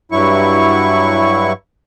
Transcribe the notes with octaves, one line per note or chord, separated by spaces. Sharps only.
G2 F#3 E4 C#6